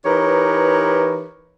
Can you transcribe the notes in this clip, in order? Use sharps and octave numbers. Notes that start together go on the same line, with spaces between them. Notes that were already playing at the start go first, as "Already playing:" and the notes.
E3 D#4 G4 A#4 B4 C#5